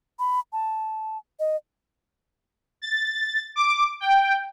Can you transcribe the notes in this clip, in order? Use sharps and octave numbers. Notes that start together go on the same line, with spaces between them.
B5
A5
D#5
A6
D6
G5